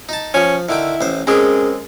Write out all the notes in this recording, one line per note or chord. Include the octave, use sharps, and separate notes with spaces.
D#4 A5
F3 C#4
D3 D#3 E4 G5
A1 C5
G#3 C4 C#4 G4 G#4 A#4